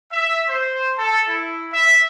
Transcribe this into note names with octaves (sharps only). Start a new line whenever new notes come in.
E5
C5
A4
E4
E5